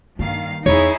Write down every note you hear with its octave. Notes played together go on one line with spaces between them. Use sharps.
G2 D#3 A#3 F5
E2 D#4 E4 G#4 C#5